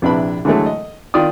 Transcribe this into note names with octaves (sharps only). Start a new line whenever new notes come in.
A#1 C3 D4 E4 B4 B5
D3 E3 F#3 G#3 A3
D#5
D#3 F4 D5 D#6